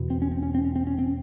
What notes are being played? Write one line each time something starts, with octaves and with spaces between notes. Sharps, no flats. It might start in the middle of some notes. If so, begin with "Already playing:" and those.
Already playing: E2 B2
C4
C#4
C4
C#4
C4
C#4
C4
C#4
C4